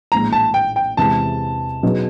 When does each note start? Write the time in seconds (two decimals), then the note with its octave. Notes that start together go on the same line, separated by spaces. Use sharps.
0.12 A#1 A2 E3 G#3 A#5
0.33 A5
0.54 G5
0.76 G5
0.97 E2 C3 E3 G#3 A5
1.83 B2 F#3 B3 D#4 G#4